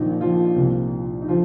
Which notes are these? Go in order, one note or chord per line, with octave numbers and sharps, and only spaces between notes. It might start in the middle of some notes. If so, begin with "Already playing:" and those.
Already playing: A#1 A#2 D#3 F3 D#4
F3 F4
C2 A#2 F3
D#4
D3 F3 F4